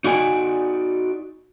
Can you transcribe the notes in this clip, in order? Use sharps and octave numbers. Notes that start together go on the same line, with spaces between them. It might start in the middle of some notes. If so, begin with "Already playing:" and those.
D#4 F#4 D5 G#5